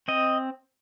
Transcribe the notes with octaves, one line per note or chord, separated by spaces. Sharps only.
C4 D#5